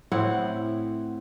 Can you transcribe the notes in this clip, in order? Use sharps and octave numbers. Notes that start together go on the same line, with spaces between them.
A2 C4 E4 F#5